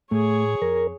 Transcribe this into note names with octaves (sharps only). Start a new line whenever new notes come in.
A2 A3 G#4 C#5
F2 A#4